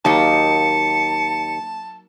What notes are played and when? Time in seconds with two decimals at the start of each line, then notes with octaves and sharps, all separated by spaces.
0.05 D#2 F#3 A#3 D#4 A5 C#7